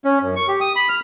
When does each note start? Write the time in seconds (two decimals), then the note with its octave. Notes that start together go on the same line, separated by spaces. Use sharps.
0.05 C#4
0.22 F#2
0.36 C#6
0.48 G4
0.61 D#6
0.76 B5
0.89 F6